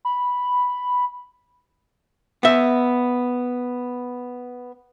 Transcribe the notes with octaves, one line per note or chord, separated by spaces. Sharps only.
B5
B3 E5